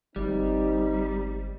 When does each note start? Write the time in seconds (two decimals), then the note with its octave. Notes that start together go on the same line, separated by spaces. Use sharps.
0.16 G1 G3 C4 D#4